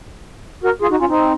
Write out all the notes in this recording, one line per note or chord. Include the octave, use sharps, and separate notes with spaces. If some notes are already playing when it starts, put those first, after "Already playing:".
F#4 A#4
F4 G#4
D#4 F#4
C#4 F4
C4 D#4